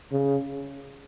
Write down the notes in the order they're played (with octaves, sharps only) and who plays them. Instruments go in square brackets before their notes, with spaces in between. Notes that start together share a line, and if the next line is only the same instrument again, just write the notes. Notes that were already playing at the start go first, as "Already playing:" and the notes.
[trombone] C#3